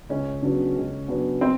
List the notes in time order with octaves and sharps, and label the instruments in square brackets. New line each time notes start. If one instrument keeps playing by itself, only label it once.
[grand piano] C#2 [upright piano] C#4
[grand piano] C#3 F#3 B3 D4
C#2
C#3 F#3 B3 D4
[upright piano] C4